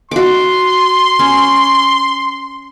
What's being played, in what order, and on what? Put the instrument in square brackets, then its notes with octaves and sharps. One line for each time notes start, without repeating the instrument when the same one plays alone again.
[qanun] F#4 D6 [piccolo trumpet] C6
[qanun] C#4